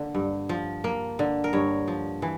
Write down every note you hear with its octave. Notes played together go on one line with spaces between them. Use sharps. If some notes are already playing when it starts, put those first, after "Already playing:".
Already playing: D3 A#3
G2
F3
A#3
D3
A#4
G2 C#5
F3
E3